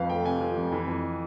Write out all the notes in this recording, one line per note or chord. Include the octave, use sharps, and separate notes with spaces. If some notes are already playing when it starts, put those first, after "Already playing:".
Already playing: F2 F3 B4 F5
A3 G5
C3 G#5
F3
F2
E3
F2